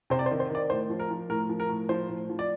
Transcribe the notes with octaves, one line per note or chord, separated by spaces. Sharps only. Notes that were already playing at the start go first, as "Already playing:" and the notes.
C3 C5
D5
C5
D#3
C5
D#3 D5
A2 C5
F3
A#4
F3
A2 A#4
F3
A#4
A2
F3 C5
A2
F3
D5